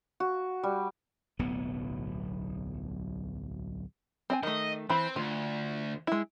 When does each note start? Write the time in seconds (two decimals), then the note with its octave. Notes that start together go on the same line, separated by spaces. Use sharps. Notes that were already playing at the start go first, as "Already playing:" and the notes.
0.20 F#4
0.63 G3
1.39 D1 B1 A2 B3
4.30 C4 D#5 G#5
4.43 D#3 A3 D#5
4.90 E3 C4 C5 B5
5.16 D2 F4
6.07 G#3 E4